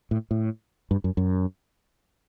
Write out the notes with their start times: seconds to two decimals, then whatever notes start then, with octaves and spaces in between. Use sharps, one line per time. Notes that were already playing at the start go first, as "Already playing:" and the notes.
0.11 A2
0.31 A2
0.91 G2
1.04 F#2
1.17 F#2